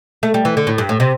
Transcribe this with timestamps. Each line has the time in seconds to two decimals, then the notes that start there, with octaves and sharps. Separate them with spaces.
0.23 A3
0.34 G3
0.45 E3
0.57 D3
0.67 A2
0.78 G2
0.89 A2
1.00 C3